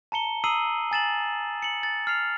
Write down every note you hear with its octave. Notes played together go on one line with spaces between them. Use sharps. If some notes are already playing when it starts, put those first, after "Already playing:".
A5 A#5 C#7 G7
A#5 D#6 E6 C7 D#7 F#7
G#5 A6 E7 F#7
C#7 F#7
A6 F#7
F6 C7 F7